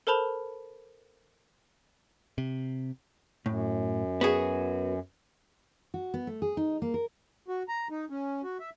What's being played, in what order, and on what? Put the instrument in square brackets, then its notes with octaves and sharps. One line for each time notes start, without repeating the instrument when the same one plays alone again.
[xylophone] A4 A#4 C5 A5 B5 F7
[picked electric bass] C3
[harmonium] F#2 [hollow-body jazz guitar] A2
[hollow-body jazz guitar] B3 F#4 G#4
[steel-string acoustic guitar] F#4
B3
A3
G#4
D#4
A#3
A#4
[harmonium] F#4
A#5
D#4
C#4
F#4
E5